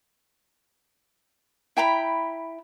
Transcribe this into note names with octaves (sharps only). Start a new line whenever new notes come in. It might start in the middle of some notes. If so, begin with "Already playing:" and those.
E4 G5 A#5 B5